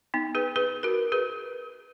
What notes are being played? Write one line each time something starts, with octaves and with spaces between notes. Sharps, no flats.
B3 D#4
G#4 B4
G#4 B4
F#4 A#4
G#4 B4